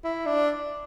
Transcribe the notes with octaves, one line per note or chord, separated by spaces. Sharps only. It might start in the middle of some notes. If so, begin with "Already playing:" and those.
E4
D4